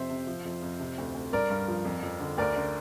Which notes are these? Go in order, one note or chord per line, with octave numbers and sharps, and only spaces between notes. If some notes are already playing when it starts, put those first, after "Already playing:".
Already playing: F2 C3 C5 E5
C3
F3
F2
F2
C3
D2
D2
G2 A#4 D5
G2
F3
F2
F2
D3
D2 A#4 D5
D3